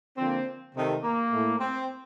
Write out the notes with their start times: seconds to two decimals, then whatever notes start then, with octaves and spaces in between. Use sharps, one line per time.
0.18 D3 F3 A#3 C4
0.74 C3 D#3 A3
1.03 A#3
1.31 A2 A3
1.59 C4